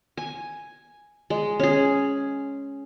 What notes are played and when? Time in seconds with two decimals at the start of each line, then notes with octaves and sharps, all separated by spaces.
0.18 G#5
1.30 G#3
1.60 C#4 G#4